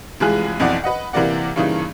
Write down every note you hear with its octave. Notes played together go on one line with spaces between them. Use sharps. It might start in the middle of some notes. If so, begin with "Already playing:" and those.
F1 E3 G#3 F4 G#4 F#6
B1 F2 E3 D5 F#5
B4 D#5 F#5
C3 E3 A#3 A#4 D5 F#5
G2 C#3 E3 A#3 D#4